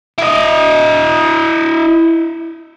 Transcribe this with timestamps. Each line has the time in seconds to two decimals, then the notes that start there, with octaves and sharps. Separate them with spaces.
0.18 E4 D#5